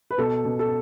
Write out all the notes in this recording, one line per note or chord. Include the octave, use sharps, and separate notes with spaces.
B4
B2 A4
B2
A4